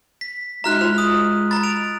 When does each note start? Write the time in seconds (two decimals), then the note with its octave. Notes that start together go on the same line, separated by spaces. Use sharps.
0.21 B6
0.64 G#3 D#4 F#4 E5 A#5 F6 F#6
0.81 F4 C5 F7
0.98 D#6
1.51 A#5 B5 A6
1.63 D7 F7